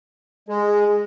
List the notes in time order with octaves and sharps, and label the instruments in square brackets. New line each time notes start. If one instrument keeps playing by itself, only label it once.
[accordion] G#3 [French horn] G#4